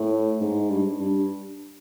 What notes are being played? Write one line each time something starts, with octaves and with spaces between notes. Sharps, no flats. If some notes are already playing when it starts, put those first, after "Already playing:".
Already playing: A2
G#2
G2
G2